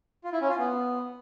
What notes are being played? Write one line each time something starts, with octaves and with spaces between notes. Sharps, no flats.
F4
E4
C#4
F4
B3